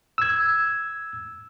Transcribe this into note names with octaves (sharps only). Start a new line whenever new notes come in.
E6 G#6